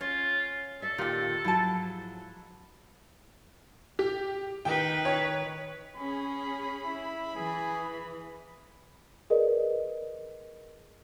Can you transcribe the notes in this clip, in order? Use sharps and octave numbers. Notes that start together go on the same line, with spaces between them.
C#4 F4 C#5
A4 C#5 D5 E5
A#2 D#3 F4 G4 G5
G#2 F3 F#3 E4 A5
G4
D#3 B4 G5
C#5
C#4 G#4 B5
E4
E3 G#4
G#4 A#4 B4 D5 D#5